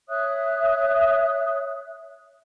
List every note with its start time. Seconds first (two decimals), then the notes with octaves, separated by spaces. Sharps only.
0.09 C#5 E5 D#6 F#6